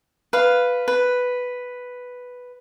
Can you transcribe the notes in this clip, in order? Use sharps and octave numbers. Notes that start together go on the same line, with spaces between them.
B4 F5
B4